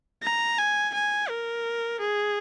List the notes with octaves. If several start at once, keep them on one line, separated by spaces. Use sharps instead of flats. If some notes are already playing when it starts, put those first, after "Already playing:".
A#5
G#5
G#5
A#4
G#4